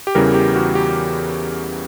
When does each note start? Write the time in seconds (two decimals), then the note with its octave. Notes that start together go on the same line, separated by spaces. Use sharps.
0.07 G4
0.15 E2 C#3 E3 G3 A#4
0.34 G4
0.55 F#4
0.75 G4